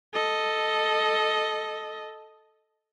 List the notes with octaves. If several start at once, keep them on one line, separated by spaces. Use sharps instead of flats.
A4 D#5